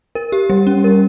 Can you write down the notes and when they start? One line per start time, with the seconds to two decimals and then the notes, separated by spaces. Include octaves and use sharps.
0.15 A#4
0.32 G4
0.50 G3
0.67 C#4
0.84 A#4